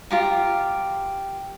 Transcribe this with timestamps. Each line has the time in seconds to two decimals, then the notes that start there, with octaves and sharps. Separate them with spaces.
0.11 F4 G4 A#5